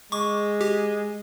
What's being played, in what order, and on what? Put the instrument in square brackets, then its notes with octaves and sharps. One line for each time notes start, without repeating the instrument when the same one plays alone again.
[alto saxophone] G#3 [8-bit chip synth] C#6 D6
[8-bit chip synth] G4